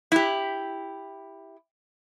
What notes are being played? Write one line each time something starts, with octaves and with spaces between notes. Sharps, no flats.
E4 G4